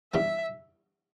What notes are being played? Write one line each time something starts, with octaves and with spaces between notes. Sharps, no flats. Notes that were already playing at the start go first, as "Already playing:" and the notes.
G2 E3 B3 E5